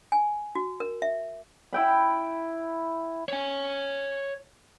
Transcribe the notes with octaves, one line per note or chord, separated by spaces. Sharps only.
G#5
F#4
A#4
E5
E4 G5 B5
C#5 G#5